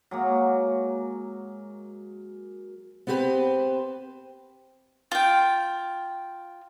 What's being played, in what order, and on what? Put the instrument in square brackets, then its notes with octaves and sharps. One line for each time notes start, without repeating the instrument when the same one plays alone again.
[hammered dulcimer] F#3 G#3 A#3
[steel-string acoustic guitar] B3 C4 G4 A4 B4 C5
[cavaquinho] F4 G5